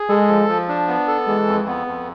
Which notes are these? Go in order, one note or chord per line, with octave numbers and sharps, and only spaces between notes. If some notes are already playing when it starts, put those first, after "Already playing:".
Already playing: G#4
G#3 A4
F3
F3
D4
B3
A4
E3 G#3
F2
B3
F2